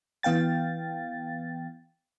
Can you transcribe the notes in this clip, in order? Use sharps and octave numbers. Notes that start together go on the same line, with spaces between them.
E3 B3 F5 G5 A6